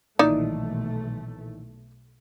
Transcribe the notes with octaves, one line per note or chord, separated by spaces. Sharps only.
B1 A#2 D#3 E3 A3 D#4 E4 D5